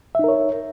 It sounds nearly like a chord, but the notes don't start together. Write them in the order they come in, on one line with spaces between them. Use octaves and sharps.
E5 D#4 A#4 C#5